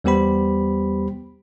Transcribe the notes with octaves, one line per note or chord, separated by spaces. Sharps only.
E2 G3 B3 G4 C5 B5